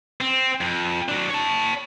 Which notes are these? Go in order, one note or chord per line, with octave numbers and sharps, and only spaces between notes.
C4
F2
F#3 D4
C#5 A5